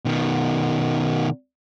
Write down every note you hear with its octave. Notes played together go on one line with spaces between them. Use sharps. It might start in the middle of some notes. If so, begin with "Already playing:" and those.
B2 D#3